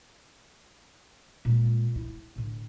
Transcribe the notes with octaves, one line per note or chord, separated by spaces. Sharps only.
A#2 G#3
E4
A2 D3